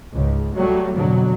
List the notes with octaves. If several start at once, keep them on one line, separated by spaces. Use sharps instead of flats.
C#2 G#2
F#3 G3 A3
F2 B2 D3 F#3